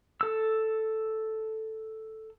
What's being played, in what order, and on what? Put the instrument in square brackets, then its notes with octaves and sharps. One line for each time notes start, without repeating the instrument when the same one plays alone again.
[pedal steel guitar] A4 E6